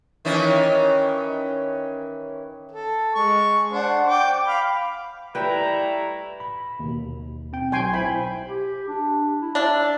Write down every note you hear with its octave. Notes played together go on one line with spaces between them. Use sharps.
D#3 E3 C#4
A4
G#3 C#6
D4 C5 F#5
G5 D6
F5 B5
G3 A3 E4 B4 G5 A#5
B5
D#2 B2
C4 G5
B1 G5 G#5 C6
E4 C5 B5
G4
D4
E4
D4 E5